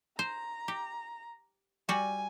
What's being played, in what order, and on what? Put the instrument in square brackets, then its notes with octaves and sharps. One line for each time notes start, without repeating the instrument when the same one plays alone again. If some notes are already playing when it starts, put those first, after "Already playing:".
[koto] C5 [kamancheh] A#5
[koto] G4
[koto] G3 F#4 [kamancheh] G#5